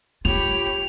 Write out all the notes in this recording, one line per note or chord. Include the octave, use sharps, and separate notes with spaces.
F4 G4 C#5 B5 F7